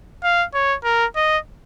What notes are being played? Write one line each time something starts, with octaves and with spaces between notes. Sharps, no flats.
F5
C#5
A#4
D#5